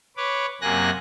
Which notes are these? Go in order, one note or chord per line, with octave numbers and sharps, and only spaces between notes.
B4 C#5 D6
F#2 C3 A#3 G#5 F#6 A#6